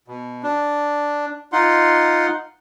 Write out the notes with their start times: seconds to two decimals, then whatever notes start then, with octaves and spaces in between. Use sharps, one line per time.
0.08 B2
0.43 D4
1.53 D#4 F4 F#5 C6